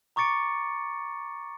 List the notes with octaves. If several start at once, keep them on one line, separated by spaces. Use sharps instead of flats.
A#5 C#6 D6 A6 C#7 D7